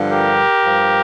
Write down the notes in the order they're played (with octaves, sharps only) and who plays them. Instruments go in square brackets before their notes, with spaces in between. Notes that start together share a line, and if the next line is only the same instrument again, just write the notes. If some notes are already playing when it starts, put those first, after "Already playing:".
Already playing: [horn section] G2 D3 F3
G4 A#4
G2 F3